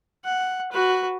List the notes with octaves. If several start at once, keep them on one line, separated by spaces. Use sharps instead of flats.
F#5
F#4 B4